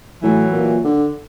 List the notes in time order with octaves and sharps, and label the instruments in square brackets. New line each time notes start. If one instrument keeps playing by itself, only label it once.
[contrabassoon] A2 [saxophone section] E3 F#3
[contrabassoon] A#2
D3